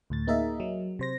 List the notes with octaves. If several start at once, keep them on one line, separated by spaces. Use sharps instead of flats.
D2 A2 A6
A#3 D#4 G#4 A#4 D#5 E5
F#3
C3 C5 A#6